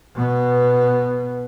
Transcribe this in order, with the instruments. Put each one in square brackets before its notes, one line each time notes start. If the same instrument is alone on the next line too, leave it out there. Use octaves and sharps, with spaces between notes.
[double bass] B2 B3